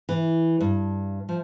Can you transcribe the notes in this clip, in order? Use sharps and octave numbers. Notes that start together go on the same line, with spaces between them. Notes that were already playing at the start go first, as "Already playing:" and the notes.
E3
G2
F3